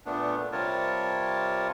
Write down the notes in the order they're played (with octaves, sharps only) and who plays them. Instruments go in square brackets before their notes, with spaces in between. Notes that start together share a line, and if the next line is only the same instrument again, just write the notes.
[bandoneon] A#2 A3 B3 D4
C3 G3 F4 A#4 C#5 A5